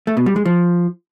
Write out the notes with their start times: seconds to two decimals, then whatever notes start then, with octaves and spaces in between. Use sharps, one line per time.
0.07 A3
0.17 B2
0.26 G3
0.36 G#3
0.45 F3